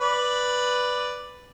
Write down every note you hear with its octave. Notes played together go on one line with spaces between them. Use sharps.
B4 D5